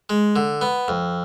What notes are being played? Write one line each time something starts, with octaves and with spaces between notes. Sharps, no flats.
G#3
D3
B3
F2